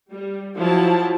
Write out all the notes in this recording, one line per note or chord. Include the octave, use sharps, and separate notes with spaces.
G3
F3 F#3 E4 A5